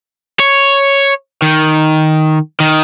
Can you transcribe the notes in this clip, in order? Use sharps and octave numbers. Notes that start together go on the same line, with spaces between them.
C#5
D#3
D#3